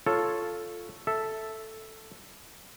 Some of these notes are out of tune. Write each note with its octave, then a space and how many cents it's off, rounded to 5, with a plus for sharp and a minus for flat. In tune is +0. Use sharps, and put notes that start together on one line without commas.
F4 +0 A4 +0 C#5 +0
A4 +0 E5 +0